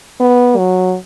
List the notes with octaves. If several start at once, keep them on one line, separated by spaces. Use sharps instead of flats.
B3
F#3